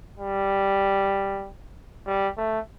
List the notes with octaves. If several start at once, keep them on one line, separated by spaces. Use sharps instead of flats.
G3
G3
A3